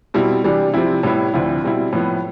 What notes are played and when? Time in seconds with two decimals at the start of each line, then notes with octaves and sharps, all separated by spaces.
0.14 B2 G3 C4 E4
0.44 C3 E3 G3 D4
0.74 C3 F3 C4 E4
1.03 A2 G3 B3 E4
1.34 D2 D3 F3 C4 E4
1.64 B2 G3 C4 E4
1.93 A2 F3 B3